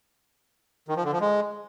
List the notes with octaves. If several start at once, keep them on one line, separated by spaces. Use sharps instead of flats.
D#3
F3
D3
F3
G#3